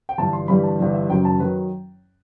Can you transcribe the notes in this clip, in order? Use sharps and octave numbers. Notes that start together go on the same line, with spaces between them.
G5
G1 G2 E3 G3 A5
C6
G1 G2 E3 G3 B5
A5
G1 G2 E3 G3
E5
F#1 F#2 D#3 F#3 G5
A5
D#3 F#3 B4